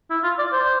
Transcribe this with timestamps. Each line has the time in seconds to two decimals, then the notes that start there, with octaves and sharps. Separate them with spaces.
0.10 E4
0.23 F4
0.39 D5
0.53 C5